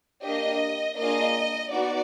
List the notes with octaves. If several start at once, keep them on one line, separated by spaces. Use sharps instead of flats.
A#3 D4 G4 D#5
A#3 D4 F4 G#4 D#5
B3 D#4 F#4 D5